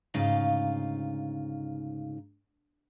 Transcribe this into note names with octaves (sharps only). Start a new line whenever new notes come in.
D2 G#2 C#3 D#4 F4 F5